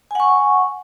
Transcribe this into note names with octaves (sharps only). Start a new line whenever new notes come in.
F#5 G#5 C#6